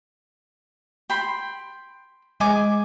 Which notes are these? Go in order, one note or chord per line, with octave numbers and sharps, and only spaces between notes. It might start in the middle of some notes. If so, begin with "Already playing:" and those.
G5 B5 C6
G#3 D#5 G#5 D6